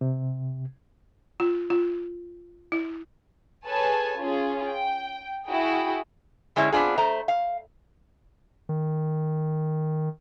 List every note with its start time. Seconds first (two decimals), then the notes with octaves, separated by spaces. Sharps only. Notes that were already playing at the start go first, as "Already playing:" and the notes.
0.01 C3
1.40 F4
1.70 F4
2.72 E4
3.66 G#4 A4 B4 C#5 G#5 A5
4.16 C#4 F4 G#4
4.68 G5
5.48 E4 F#4 G#4 G5
6.56 D3 G#3 C#4 E4
6.72 B3 C4 D4 F4 G#4
6.98 A3 C5 A#5
7.28 F5
8.69 D#3